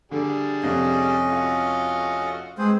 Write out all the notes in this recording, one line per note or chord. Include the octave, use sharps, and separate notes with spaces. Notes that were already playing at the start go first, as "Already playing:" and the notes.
D3 G3 D4 G#4
F2 C3 C#4 D#5
A3 F4 F#4
G#3 C4 G#4 B4 C5